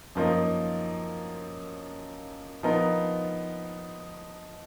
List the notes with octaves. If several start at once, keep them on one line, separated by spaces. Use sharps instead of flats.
F#2 F3 A#3 D#4
F3 B3 D#4 A#4